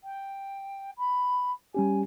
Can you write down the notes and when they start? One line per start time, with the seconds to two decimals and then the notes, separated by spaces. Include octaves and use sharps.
0.04 G5
0.98 B5
1.74 G3 C#4 G4 G#5